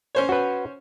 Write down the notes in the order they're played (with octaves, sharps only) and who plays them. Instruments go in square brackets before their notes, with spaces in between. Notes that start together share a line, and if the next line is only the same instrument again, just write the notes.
[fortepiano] C#4 C5 C#5
[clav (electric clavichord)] F#4 B4